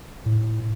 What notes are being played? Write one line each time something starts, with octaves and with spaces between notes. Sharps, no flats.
A2